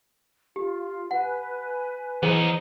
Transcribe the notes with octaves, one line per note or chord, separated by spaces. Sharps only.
F4 G4
B4 F#5 G#5
E3 B3 D#4 G#4 C5